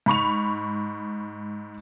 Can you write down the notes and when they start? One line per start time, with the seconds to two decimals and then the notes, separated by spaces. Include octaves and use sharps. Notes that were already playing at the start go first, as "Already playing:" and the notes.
0.06 G#2 B5 C#6 F7